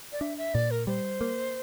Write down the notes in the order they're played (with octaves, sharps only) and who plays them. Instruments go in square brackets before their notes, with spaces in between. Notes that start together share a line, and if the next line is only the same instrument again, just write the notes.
[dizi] D5
[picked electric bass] D4 [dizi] E5
[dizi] E5
[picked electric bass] A#2 [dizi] D5
[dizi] A#4
[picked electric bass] G3 [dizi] C5
[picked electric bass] A#3